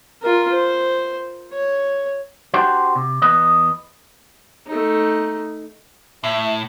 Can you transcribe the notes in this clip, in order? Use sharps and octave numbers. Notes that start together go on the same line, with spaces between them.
F4 A#4
C5
C#5
D4 F#4 G4 C5
C3
E2 B4 D#5
A3 D#4
A2 E5